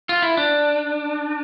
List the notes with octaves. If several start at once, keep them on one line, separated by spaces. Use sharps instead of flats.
F4
E4
D4